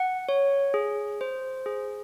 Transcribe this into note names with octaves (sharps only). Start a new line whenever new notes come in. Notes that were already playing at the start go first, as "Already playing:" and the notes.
Already playing: F#5
C#5
G#4
C5
G#4